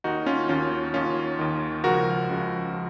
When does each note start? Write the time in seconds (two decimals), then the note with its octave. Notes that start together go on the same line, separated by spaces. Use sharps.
0.04 D#2 D#3 D#4 F#4
0.26 C#4 F4
0.49 D#2 D#3 C#4 F4
0.94 D#2 D#3 C#4 F4
1.39 D#2 D#3
1.84 C#2 C#3 F3 F#4 A#4
2.29 C#2 C#3 F3
2.73 F3